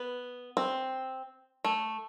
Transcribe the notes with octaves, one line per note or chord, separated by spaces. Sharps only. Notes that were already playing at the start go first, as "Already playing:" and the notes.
Already playing: B3
C4
A3